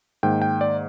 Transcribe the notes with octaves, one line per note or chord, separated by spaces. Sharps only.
G#2 D#3 A#3 G5
G5
D5